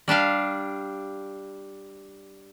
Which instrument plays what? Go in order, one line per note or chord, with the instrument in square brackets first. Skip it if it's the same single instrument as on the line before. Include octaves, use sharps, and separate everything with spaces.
[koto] G3 D4 G4 F5